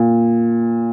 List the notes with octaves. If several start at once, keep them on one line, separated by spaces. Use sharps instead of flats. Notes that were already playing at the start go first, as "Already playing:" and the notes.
Already playing: A#2